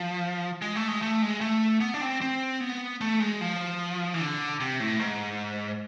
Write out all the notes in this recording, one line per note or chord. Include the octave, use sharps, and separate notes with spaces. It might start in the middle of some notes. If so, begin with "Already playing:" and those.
Already playing: F3
G#3
A3
G#3
A3
G#3
A3
B3
D4
C4
C4
B3
A3
G#3
F3
E3
D3
C3
A2
G#2